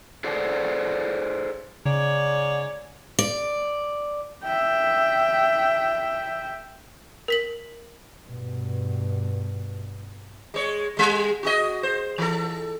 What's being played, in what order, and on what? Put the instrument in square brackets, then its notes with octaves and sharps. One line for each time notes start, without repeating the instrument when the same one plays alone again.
[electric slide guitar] G#4 A4 C5 D5 F#5
[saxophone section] G#2 C#5 D5 [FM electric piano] C#3
[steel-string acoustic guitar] D5
[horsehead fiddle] E5 G5
[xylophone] A#4 B6 F#7
[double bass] G2 B2
[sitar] G#3 C#5
G3 G#3
F#4 G#4 D#5
C5
E3 A4